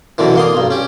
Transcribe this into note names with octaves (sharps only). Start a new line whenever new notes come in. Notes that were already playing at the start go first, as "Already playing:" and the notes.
F#2 B2 D3 E3
A#3 C6 D#6
B1 G2
C#4 G4